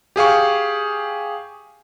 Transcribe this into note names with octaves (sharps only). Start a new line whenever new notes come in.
G4 G#4 F5 C#6